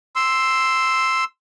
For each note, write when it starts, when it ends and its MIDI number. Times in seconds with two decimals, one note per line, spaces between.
0.16 1.24 84
0.16 1.24 88